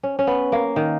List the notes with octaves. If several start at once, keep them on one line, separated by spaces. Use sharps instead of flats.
C#4
C#4
B3
A#3
D#3